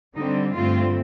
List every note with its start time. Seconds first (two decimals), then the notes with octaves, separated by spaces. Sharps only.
0.17 D3 G3 C4 D#4
0.55 G2 D3 A3 C4 F4